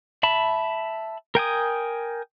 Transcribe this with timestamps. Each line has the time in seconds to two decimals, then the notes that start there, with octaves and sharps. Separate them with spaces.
0.23 E5 A5 B5
1.35 A#4 G5 G#5 D#6